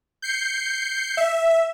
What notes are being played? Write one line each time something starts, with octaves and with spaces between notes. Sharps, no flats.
G6 C7 C#7
E5